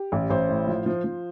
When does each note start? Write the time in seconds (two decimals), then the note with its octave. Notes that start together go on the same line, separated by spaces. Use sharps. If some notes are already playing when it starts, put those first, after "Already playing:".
Already playing: G4
0.12 A1
0.30 A1 C5
0.49 A2
0.67 F3
0.86 F3
1.04 F3